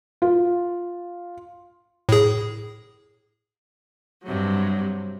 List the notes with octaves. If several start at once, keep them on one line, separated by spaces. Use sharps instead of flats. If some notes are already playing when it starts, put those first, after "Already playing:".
F4
A2 G#4
G2 C3 F#3